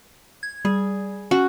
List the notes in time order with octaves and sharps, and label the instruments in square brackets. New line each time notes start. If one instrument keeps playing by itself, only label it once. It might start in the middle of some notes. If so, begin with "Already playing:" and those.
[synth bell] G#6
[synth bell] G3 [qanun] G#4
[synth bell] C#4 [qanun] F#4